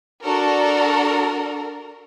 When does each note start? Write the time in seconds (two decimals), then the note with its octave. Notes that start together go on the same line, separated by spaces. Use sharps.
0.24 D4 F#4 A4 A#4